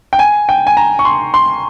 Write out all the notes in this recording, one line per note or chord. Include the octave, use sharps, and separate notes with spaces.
G5
G#5
G5
G#5
A#5
C#6
C6
C6